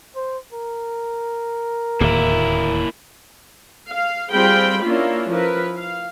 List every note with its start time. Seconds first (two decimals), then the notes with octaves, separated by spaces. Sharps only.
0.16 C5
0.53 A#4
2.00 D1 D#2 A2 A#3 E4
3.90 F5
4.31 G3 C4 F4 G#4 G5 B5
4.84 A#3 C#4 D4 E4 F4
5.31 F3 E4 A#4 B4
5.77 F5